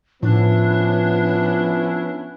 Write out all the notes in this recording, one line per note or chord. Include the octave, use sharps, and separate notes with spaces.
A2 F3 B3 C#4 D4 E4